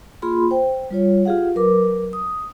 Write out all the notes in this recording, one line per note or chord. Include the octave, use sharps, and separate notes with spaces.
A#3 F4 G#4 B5 C6
C5 G5
G3 F4 C#5
F4 G4 G#4 F5 F#5
F#3 A#4 B4 D6
D#6